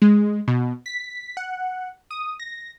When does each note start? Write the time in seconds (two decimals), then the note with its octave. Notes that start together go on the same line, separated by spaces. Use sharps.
0.02 G#3
0.48 B2
0.86 B6
1.37 F#5
2.11 D#6
2.40 A#6